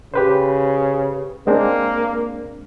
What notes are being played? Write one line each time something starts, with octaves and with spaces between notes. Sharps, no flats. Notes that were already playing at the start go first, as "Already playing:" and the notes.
C#3 G4 B4 C5
G#3 A#3 C4 D4